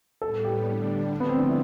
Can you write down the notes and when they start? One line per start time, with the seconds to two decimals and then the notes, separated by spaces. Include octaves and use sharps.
0.22 A2 G3 B3 A4
0.45 G4
0.67 D3 G3 D4
1.11 D3 F3 A3
1.20 B3
1.29 C4
1.38 D4
1.47 E4